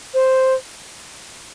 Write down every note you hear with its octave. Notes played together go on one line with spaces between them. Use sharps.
C5